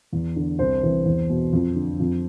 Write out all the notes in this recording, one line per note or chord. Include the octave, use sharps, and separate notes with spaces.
E2
D3
C2 C5
C3 E3
E2
B2
F2
D3
F2